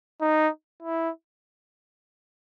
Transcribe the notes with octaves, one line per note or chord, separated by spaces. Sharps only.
D#4
E4